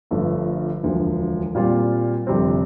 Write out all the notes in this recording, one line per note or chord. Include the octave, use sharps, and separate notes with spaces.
G1 G2 F3 A3
E1 D2 D3 F3
A#2 G3 C4 F4
G1 F2 C3 G3 C4